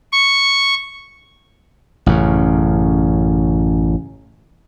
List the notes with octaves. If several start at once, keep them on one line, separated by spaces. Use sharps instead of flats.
C#6
A1 F#2 C#3